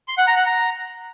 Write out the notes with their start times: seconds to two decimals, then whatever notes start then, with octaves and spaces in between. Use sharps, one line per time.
0.08 C6
0.18 F#5
0.27 A#5
0.37 F#5
0.46 A#5